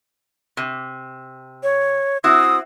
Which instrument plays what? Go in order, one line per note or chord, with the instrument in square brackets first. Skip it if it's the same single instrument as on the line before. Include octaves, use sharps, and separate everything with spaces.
[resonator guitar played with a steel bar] C3
[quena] C#5
[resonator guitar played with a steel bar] C4 E4 F#4 [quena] D#6